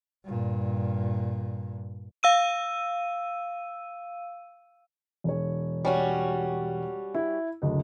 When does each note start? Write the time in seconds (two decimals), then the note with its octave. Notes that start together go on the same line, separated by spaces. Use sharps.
0.24 G2 A#2
2.23 F5 E6 D#7
5.24 E1 C#5
5.85 G3 C#4 F#4
7.14 E4
7.62 F#1 D2 D#5